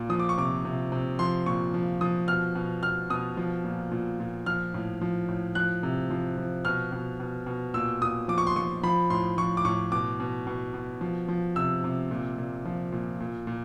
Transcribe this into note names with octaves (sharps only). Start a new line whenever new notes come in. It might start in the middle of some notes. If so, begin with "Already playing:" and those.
Already playing: A#2
F3 D#6
D6
C#6
C3 D6
C3
C3
F3 C6
A#2 C#6
F3
F3 D#6
B2 F6
B2
B2 F6
B2 D#6
F3
A#2
A#2
A#2
F3 F6
A2
F3
A2
F3 F#6
C3
F3
F3
B2 F6
B2
B2
B2
A#2 E6
A#2 D#6
F3 D6
C#6
C6
F3 C#6
F3 B5
A2 C6
F3 C#6
D6
A2 C#6
B2 D6
B2
B2
B2
F3
F3
C3 E6
C3
A#2
A#2
F3
A#2
A#2
A#2